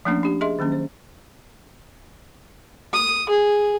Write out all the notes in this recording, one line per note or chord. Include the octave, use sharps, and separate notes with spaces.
F3 A3 A#3 C#4 D4
D4 G4
G#4 D#5 E5 C6
D#3 F#3 A#3 C#4
C5
D#6
G#4